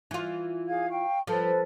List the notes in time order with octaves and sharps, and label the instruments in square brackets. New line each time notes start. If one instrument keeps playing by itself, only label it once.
[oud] E3 F4
[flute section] G#4 F5 G#6
F5 G5 C#6
[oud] F3 [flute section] A4 B4